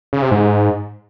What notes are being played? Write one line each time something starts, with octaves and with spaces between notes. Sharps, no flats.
C#3
C3
G#2